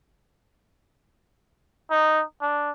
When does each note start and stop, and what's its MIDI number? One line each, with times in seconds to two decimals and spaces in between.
1.91 2.23 63
2.42 2.71 62